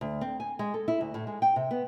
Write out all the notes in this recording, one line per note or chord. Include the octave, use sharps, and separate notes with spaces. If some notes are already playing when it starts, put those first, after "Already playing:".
D2
C4
G#5
G#3
A4
E4
D2
A2
G#3
G5
C3
B3